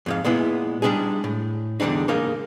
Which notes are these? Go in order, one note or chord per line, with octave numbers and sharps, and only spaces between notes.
F2 G#2 F5
A#2 G#3 B3 E4
G3 G#3 D4 D#4 G#4
A2
E2 D3 G3 D4 D#4
G#2 C#3 A#3 D#4 A#4 F5